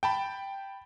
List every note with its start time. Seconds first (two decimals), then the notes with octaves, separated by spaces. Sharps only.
0.03 G5 A5 B5